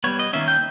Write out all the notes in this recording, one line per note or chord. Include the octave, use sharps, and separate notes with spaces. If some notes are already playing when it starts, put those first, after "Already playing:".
G3 B3 C#5
D#5
D#3 A#3 C#4 E5
G5